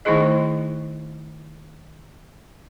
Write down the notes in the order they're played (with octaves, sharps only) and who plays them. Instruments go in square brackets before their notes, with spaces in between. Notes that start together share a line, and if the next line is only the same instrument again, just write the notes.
[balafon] D#3 A3 D#4 E4 G#4 D#5